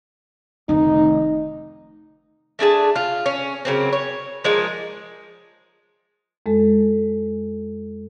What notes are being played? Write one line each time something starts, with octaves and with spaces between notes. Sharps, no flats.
F1 D#3 D#4
A3 D4 G#4 A5
F4
C#4
C#3 F#3 A#3 C4
C#5
F3 G#3 A#3 D#4
F2 G#3 A4